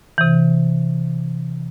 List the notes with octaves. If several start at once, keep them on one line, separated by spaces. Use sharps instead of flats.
C3 E3